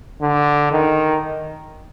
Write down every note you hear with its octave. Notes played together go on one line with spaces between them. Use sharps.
D3
D#3